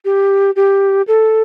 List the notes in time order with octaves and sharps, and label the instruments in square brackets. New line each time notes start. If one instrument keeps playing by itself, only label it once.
[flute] G4
G4
A4